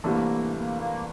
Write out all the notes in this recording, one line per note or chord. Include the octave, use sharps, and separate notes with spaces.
C2 C3 E3 A3 A#3 D4
A#3
A#3